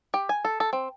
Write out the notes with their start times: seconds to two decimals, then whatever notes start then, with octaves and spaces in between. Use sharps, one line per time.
0.14 G4
0.29 G#5
0.45 A4
0.60 A4
0.73 C4